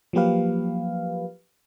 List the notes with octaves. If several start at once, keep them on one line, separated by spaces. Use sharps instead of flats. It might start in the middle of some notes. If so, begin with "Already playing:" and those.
F3 F#3 A#3 G4 B4 F5